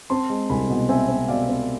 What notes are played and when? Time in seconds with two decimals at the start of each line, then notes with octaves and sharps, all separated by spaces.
0.10 C4 A5 C6
0.30 G#3
0.50 C2 G#5 B5
0.69 B2
0.89 C4 E5 G#5
1.08 C4
1.28 B2 D5 F5
1.49 C4